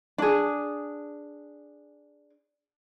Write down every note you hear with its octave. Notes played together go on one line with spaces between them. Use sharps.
D4 G#4